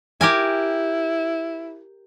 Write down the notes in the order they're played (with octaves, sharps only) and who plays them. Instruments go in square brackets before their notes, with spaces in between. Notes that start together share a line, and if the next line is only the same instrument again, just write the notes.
[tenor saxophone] E4 [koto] G4 A#4 G#5